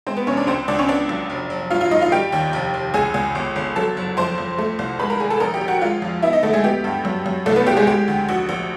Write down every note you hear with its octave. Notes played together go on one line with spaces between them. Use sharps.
G#3 C4 C5
B3 B4
F1 C#4 C#5
D4 D5
C#2 C4 C5
C#2 D4 D5
C#4 C#5
B3 D4 D5
B1
F1
F1
G2 F4 F5
F4 F5
G2 D#4 D#5
F4 F5
G3 G4 G5
D#2
F1
F1
C#2 G#4 G#5
C#2
G1
G1
F#3 A4 A5
F#1
F2 C5 C6
F2
A3
C2
G#3 B4 B5
A#4 A#5
G#1 G#4 G#5
A4 A5
A#1 A#4 A#5
G4 G5
A#1
F#4 F#5
G#3 F4 F5
F2
B3 E4 E5
D#4 D#5
D2 A3 A4
G#3 G#4
B3 G4
G2
F#2
F#2
C2 A3 A4
B3 B4
C2 G4
G#3 G#4
G#3 G4
D2
A#1 F#4
A#1